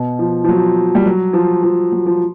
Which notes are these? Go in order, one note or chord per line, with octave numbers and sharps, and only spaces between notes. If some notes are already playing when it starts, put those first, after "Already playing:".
Already playing: B2
F3
F3
F#3
G3
F#3
F3
F3
F#3
F3